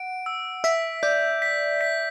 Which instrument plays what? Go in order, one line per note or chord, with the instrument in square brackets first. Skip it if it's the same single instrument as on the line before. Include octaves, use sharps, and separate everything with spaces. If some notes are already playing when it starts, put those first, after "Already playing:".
Already playing: [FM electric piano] F#5 [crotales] D7
[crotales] E6
[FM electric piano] E5 [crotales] B6
[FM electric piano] D5 [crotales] G6
[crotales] B6
B6